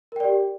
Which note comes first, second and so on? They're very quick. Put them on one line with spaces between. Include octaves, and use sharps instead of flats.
A#4 G5 D5 G4